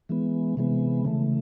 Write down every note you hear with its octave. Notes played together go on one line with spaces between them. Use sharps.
E3 G#3 B3
C3 E3 G#3 B3
C#3 E3 A3